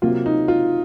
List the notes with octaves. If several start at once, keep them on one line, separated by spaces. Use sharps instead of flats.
C3 F#3 A#3 F4
D#4
F4